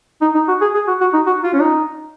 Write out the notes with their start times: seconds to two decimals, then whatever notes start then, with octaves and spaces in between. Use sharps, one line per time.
0.22 D#4
0.35 D#4
0.48 F#4
0.61 G#4
0.75 G#4
0.88 F#4
1.01 F#4
1.14 D#4
1.26 F#4
1.44 F4
1.54 C#4
1.61 D#4